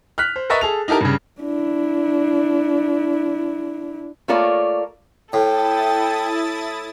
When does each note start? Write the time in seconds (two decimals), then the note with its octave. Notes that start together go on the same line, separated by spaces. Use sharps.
0.18 F6 F#6 B6
0.36 C5
0.50 A#4 B4 D#5 E5 C#6 A6
0.61 G#4 A4 F7
0.88 D#4 E4 G4 A4 A#4
1.01 G2 C#3
1.41 D4 E4
4.28 A3 A#3 F4 A#4 C#5 D5
5.33 A2 E4 A4 G5 D#6 A6